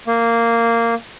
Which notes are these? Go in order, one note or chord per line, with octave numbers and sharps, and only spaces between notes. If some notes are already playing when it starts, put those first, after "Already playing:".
A#3